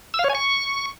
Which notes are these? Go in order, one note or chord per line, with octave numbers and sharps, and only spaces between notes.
E6
F5
C#5
G#5
C#6